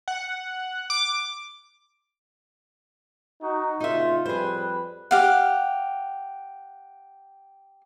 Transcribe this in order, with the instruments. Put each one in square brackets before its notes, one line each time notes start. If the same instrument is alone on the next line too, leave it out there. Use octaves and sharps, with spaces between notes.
[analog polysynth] F#5
D6
[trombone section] D#4 F#4
[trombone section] A#2 C#3 F4 [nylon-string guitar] D#4 E5
[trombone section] F2 G3 B4 [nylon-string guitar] G#4 C5
[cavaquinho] G4 F5 F#5